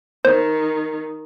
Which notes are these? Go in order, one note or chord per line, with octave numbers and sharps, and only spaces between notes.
D#3 C5